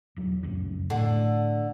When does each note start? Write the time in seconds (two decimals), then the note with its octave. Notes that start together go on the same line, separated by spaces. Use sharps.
0.16 E1 F#3
0.43 F1 C#2 F#2
0.90 A2 D3 A3